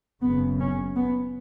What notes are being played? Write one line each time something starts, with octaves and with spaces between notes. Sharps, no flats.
F#1 F#2 C#3 B3
C#4
B3